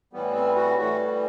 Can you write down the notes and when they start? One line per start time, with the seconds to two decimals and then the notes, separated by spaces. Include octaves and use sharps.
0.13 A2 E3 G3 B3
0.35 C4
0.56 F#4
0.78 A2 E3 G3 F#4